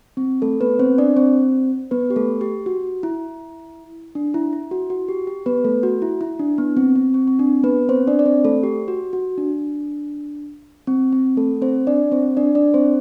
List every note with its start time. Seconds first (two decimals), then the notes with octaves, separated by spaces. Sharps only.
0.17 C4
0.42 A3 A4
0.61 B3 B4
0.79 C4 C5
0.98 D4 D5
1.17 C4 C5
1.91 B3 B4
2.10 G4
2.16 A3 A4
2.41 G4
2.66 F#4
3.03 E4
4.15 D4
4.34 E4
4.53 E4
4.71 F#4
4.90 F#4
5.08 G4
5.27 G4
5.46 B3 B4
5.64 A3 A4
5.83 F#4
6.02 E4
6.21 E4
6.39 D4
6.58 B3
6.77 C4
6.96 C4
7.14 C4
7.27 C4
7.39 D4
7.64 B3 B4
7.89 C4 C5
8.07 D4 D5
8.19 D5
8.26 C4 C5
8.45 A3 A4
8.63 G4
8.88 F#4
9.13 F#4
9.38 D4
10.87 C4
11.13 C4
11.37 A3 A4
11.62 C4 C5
11.87 D4 D5
12.12 C4 C5
12.37 D4 D5
12.55 D4 D5
12.74 C4 C5